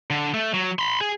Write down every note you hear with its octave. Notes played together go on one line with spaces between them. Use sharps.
D3
A3
F#3
B5 C6
G#4